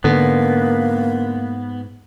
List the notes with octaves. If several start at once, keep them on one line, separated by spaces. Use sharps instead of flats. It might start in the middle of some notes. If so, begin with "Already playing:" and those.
G#2 D3 A#3 B3